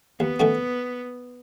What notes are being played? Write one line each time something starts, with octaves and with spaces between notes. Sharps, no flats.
D#2 B3
D#3 A3 C#4 F#4